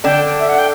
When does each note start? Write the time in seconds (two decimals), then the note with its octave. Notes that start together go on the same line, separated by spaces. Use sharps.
0.04 D3 D4 G5
0.39 E5
0.49 F#5
0.59 G5